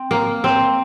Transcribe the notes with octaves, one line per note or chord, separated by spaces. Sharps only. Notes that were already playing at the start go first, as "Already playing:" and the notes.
Already playing: C4
A#3
C4